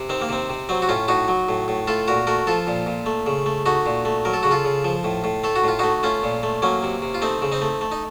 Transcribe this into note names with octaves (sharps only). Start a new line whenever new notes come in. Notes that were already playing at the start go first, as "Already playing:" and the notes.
Already playing: C3
D#3 C4
A#3
C3 C4
C3
F#3 C4
F#4
A2 C#4 F4
A2 D#4 F#4
F#3
A2
A2
A3 F4 A4
A#2 F#4 A#4
A3 F#4 A#4
F3 F4 A4
A#2
A#2
A3
C#3
A3
A3 D#4 F#4
A#2
A3
F#3 A#4
A4
C#3 F#4
F4 A4
C#3
F3
A2
A2
A3 A4
F#4
A2 F4
A3 D#4 F#4
A3 C#4 F4
A#2
A3
F#3 A#3 C#4
C3
C3
F4
A3 C4 D#4
C#3
C4 D#4
A3
A3
D#4